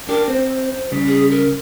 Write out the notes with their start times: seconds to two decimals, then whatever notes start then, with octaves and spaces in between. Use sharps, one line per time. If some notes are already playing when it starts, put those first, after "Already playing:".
0.09 D4 G4 A#4
0.28 C4 C5
0.92 C#3 G3
1.07 G#4
1.31 A#4